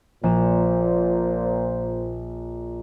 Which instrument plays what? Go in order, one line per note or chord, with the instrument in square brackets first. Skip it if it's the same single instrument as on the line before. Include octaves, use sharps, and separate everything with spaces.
[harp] A#1 E7 [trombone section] A#2 C5